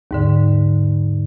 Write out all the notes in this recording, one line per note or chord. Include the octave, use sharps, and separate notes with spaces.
D#2 G#2 D3